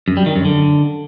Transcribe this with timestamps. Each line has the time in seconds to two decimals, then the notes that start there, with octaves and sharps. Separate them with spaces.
0.08 F#2
0.17 G3
0.26 D#3
0.36 F#2
0.45 D3